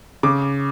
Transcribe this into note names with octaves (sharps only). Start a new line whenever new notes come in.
C#3 D6